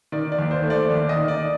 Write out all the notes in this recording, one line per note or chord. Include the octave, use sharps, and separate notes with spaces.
D#3 D5
D5
D#2
C5
A3
D5
D#2 D5
D#5
D#3
D5